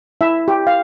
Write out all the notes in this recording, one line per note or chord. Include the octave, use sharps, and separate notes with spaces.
E4 E5
G4
F5